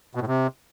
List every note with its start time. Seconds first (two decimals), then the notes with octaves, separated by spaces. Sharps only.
0.15 B2
0.21 A2
0.27 C3